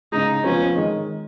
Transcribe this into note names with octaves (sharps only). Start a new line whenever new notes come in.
C#2 C#3 G#3 D#4
F1 F2 F3 B3 C#4 F4
D#3 G#3 D#4